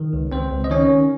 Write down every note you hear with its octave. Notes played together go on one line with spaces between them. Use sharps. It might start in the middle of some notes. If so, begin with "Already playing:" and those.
Already playing: D#3
C#2
C#2 C4 C5
C#2
D#5
D#3 C#4 C#5
D#3